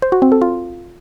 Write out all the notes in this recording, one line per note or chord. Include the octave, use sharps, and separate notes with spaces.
C5
F#4
C4
A4
F4